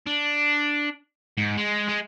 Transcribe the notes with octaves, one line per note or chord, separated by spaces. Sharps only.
D4
G#2
G#3
G#3